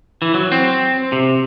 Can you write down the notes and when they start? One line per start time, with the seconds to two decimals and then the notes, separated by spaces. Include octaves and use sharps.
0.22 E3
0.34 F#3
0.52 C4
1.12 C3